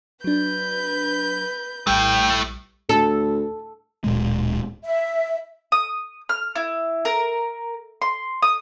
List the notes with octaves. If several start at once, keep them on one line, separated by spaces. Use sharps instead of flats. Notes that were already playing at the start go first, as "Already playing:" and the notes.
F#3 D4 B4 G6
A#1 A2 G3 A3 G5
D2 A4
D1 A#2 G#3
E5
D#6
F6
E4
A#4
C6
D#6